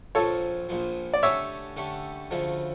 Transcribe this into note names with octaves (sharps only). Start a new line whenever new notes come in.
A#1 A#2 F3 A4 C#5
A#1 A#2 F3
D5
D3 A3 C#4 G4 C#5 E5
D3 A3 C#4 G4
D2 C#3 F3 A3